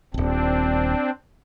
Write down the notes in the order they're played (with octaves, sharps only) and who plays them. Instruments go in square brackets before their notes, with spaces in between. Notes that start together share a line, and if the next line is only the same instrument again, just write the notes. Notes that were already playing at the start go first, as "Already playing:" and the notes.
[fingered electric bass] D#1 G#1 [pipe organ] C4 D4